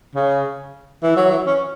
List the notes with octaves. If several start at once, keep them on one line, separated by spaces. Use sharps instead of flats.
C#3
E3
F#3
E3
C#4